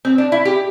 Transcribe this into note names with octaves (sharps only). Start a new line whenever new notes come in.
C4
D4
E4
G4